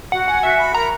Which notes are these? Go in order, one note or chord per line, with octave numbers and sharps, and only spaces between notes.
F#4 F#5
F#5 G#5
F#4 E5
B5
A#4 A#5